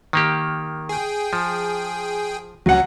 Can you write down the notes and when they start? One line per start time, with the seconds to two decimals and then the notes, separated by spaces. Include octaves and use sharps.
0.13 D#3 A#3 G4
0.89 G#4 G5
1.33 F3
2.66 C#2 F#3 C#4 F#5